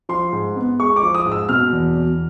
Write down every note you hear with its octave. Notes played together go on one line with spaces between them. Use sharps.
F3 C6
G#2
B3
G#3 C#6
D6
F3
D#6
G#2
E6
B2 F6
E2
E2